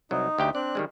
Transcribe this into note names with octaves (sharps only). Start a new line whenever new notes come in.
C2 F#3 D#4
D2 G4 G5
C4 D4 D5 F#6
D#3 G3 G#3